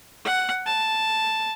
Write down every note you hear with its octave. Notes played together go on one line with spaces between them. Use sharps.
F#5
A5